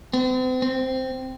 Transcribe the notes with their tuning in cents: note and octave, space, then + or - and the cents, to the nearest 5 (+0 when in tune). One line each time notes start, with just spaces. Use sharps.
C4 -40
C4 -5